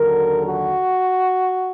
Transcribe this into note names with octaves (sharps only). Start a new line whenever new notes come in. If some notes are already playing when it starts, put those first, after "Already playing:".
Already playing: D#2 D3 F#3 A#4
F#4